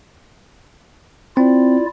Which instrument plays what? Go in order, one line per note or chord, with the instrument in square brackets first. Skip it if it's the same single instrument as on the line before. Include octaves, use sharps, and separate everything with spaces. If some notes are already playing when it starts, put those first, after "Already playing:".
[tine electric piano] C4 [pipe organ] E4 F4 D5